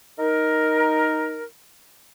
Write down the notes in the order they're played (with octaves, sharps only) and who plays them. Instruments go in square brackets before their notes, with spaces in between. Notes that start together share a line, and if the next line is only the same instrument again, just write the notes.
[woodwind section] D#4 A#4